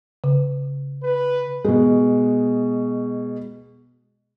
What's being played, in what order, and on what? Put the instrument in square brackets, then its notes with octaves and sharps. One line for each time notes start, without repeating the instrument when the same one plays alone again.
[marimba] C#3
[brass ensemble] B4
[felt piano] B2 G#3